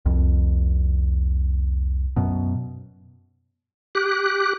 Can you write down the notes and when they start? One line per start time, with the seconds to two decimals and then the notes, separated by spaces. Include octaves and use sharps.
0.06 C2 F2
2.16 F#2 B2
3.95 G4 F#6